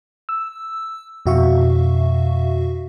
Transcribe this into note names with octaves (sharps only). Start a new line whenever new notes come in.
E6
F2 B2 F#4 E5 F5 C#6